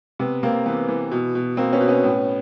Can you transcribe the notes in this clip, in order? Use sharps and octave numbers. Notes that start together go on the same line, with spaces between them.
C3 B3
C3 A#3 C4
E3 B3
E3
B2
B2
B2 A#3 C4
B3 C#4
B2
B3 C#4
A2